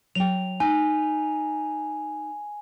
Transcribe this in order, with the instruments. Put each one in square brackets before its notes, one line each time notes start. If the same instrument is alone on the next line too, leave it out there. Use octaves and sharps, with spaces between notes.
[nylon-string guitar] F#3 G5 [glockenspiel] F7
[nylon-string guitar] D#4 [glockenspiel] G#5